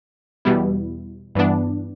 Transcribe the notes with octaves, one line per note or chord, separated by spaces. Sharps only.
E2 B2 G3 B3 E4
G2 E3 B3 D4